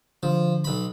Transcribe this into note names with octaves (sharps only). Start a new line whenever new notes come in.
D3 F3
B1 B5